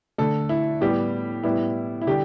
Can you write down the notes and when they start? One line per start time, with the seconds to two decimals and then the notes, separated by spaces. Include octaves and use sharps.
0.18 D3 A3 A4
0.49 E4
0.81 A2 G3 B3 G4
1.44 A2 G3 B3 E4
2.02 E4
2.07 D3 G3 G4